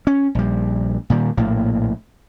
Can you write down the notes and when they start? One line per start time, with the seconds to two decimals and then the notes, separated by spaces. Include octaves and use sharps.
0.07 C#4
0.35 A#1 G3
1.10 A#2 D#3 G3
1.37 A#1 A2 A#3